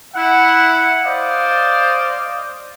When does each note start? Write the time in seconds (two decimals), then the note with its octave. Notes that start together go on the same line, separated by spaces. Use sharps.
0.14 E4 E5 F#5
1.04 C5 D5 D#5 F5